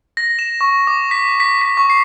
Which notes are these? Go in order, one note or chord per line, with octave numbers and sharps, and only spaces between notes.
A#6
E7
C#6
D6
B6
B6
B6
C#6
C7